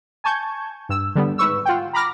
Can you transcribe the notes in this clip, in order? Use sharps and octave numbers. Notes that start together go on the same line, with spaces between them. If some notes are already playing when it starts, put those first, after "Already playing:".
G#5 A5 C#6 G6 G#6
G2 E6
D3 G3 B3
G#2 B4 C#6 E6
F4 F#5 G5
A#5 B5 D6 F6 A#6